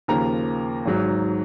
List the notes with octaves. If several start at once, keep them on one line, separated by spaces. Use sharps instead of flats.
D#2 C#3 F3 A#3 A#5
G#1 G#2 F#3